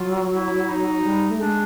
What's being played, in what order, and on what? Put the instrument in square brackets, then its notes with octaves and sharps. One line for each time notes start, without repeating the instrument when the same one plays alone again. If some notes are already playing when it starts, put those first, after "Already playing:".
Already playing: [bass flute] F#3 [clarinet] F4
[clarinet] E4
D#4
[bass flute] G3
A3
[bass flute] G#3 [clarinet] D4